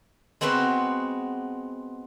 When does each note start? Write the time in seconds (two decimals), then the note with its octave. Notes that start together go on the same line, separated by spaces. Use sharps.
0.41 G#3 B3 C4 F#4 B4 C5